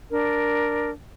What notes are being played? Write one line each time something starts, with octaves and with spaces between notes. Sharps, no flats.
D4 A#4